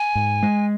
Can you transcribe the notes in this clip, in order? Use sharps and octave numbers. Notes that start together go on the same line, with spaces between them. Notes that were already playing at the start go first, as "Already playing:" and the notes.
Already playing: G#5
G#2
G#3